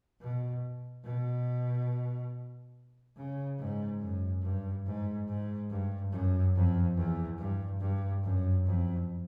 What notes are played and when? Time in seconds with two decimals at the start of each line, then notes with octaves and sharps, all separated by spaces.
0.21 B2
1.04 B2
3.16 C#3
3.58 G#2
4.00 F#2
4.42 G2
4.86 G#2
5.27 G#2
5.70 G2
6.12 F#2
6.55 F2
6.96 E2
7.38 G2
7.80 G2
8.23 F#2
8.65 F2